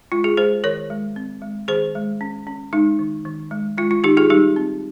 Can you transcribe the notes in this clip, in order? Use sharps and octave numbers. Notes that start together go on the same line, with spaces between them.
G#3 F4
F4 G#4
G#3 G#4 C5
D#3 A#4 C#5
G#3
C4
G#3
D#3 G#4 C5
G#3
C#4
C#4
G#3 D#4
D#3
D#3
G#3
G#3 F4
F4
D#3 D#4 G4
F4 G#4
G3 D#4 G4
C4